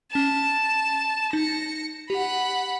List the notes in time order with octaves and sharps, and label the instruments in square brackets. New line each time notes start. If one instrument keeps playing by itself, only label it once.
[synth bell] C#4 E7 [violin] A5
[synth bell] D#4 [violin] A#6 C#7
[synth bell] G4 [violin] F#5 B5